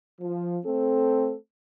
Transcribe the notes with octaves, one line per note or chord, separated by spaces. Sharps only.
F3
A3 C4 A4